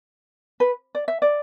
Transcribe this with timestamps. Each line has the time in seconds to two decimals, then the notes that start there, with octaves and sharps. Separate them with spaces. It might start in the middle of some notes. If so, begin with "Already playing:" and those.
0.60 B4
0.95 D5
1.08 E5
1.22 D5